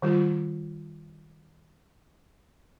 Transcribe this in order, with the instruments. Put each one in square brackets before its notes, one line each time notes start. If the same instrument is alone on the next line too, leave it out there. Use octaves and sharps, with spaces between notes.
[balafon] D#3 G3 F4